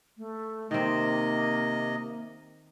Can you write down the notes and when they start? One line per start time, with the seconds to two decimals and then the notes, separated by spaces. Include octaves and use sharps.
0.18 A3
0.71 C3 D#3 A#3 C4 D#5